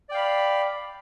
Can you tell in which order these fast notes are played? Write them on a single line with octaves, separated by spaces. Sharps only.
D5 G5 F5 B5